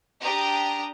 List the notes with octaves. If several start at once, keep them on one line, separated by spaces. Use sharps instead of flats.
D4 G4 A#5 D#6